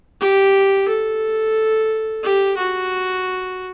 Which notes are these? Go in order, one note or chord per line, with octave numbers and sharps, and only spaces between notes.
G4
A4
G4
F#4